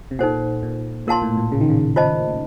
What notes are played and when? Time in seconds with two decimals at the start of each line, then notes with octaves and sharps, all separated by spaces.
0.11 C3
0.19 A#2 D#4 A4 C5 F#5
0.63 A#2
1.07 A#2 A#4 F5 A5 C6
1.22 A2
1.37 A#2
1.52 C#3
1.61 D#3
1.70 C#3
1.96 F4 C5 D#5 A5